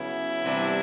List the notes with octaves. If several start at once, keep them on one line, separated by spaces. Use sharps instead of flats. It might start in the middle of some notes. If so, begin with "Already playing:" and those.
Already playing: C#3 F#3 B3 E4
C3 E3 G3 B3 D4